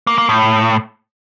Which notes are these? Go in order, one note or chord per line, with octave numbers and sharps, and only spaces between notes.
A#3
A#3
A2